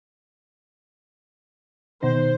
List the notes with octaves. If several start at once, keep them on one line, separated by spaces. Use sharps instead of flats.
B2 D#3 D#4 C5